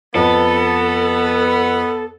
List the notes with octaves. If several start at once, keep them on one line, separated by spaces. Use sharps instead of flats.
F2 B3 A4